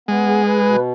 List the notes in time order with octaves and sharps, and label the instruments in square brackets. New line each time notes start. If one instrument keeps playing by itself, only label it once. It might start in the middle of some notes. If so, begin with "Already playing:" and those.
[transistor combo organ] G#3 [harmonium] B3
[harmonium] G#4
B4
B2